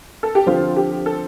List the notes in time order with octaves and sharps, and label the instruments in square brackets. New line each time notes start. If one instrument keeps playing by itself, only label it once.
[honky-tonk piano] A4
G4
[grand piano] D3 F3 C4 [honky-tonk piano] F4
[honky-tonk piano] G4
A4